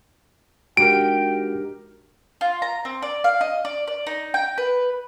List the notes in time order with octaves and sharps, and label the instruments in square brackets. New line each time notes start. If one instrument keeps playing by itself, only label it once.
[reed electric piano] G#3 D4 F#4 [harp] D#4 G4 A#4 [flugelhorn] G5 [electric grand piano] D7
[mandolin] F4
A#5
C4
D5
F5
D#5
D5
D5
D#4
G5
B4